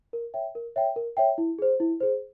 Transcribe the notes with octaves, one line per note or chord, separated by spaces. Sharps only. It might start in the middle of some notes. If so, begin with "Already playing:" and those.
A#4
C#5 E5 G5
A#4
C#5 E5 G5
A#4
C#5 E5 G5
E4
G#4 C5
E4
G#4 C5